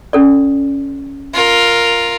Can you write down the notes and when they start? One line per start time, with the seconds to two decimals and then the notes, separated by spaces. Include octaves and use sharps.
0.13 C#4 A4 D5
1.34 F4 A#4